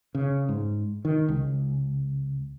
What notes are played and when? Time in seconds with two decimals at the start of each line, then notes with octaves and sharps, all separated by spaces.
0.15 C#3
0.49 G#2
1.05 D#3
1.29 C#2